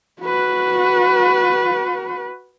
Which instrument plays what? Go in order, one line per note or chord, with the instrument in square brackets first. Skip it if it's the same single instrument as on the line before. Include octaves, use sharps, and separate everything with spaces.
[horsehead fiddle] F#4 B4